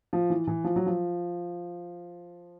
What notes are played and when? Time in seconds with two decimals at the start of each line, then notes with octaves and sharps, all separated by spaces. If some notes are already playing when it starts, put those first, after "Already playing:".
0.13 F3
0.30 E3
0.47 E3
0.64 F3
0.76 F#3
0.86 F3